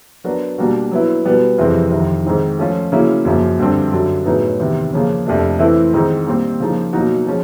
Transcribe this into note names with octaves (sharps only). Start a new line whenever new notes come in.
F#3 B3 D4 F#4 A#4
B2 G3 A#3 D4 F#4
F#3 B3 E4
B2 G3 B3
F2 C3 E3 G#3 C4
F2 C3 D#3
G#2 D#3 G#3 C4 D#4
F3 A3 C#4 F4
C#3 F#3 A#3 C#4 E4
F#2 C#3 F3 A#3
G2 D3 G3 C4
F#2 D3 F#3
A2 F#3 B3 D#4 G#4
E2 C3 D#3
C#3 F3 A#3 C#4
F2 C3 F3 A3 D4
E3 A3 C4 E4
G#2 D#3 G#3 C4 D#4
A#2 G3 C4
C#3 F3 A#3 D#4
B2 F#3 A#3 D#4 F#4
F3 G#3 C#4